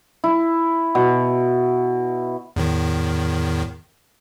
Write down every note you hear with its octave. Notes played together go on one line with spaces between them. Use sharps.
E4
B2
E2 A2 D#3